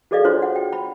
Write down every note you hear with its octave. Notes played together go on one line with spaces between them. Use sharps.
F#4 G#4 A4 D5 D#5 F5
D4 F4 F#4 C5 C#5 C6
F#5
G5
B5